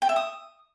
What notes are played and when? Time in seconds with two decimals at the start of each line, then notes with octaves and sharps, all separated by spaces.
0.02 G5
0.09 E5
0.16 D#6